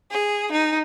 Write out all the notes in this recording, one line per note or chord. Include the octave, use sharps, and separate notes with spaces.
G#4
D#4